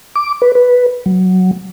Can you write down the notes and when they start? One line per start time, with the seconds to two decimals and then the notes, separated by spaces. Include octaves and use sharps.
0.15 D6
0.42 B4
0.55 B4
1.06 F#3